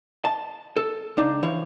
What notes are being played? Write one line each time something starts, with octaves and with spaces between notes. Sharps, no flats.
A5
A4
C#2 D4 D#4
E3 F3 C#5